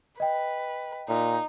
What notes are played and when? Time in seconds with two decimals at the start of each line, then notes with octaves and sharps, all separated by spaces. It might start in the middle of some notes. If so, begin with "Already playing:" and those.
0.20 B4 D#5 G5
1.09 A#2 D#4